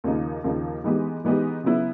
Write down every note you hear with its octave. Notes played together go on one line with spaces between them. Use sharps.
D#2 C#3 F3 A#3 D#4
D#2 C#3 F3 A#3 D#4
E3 G#3 B3 D#4 G4
E3 G#3 B3 D#4 G4
C#3 F#3 B3 E4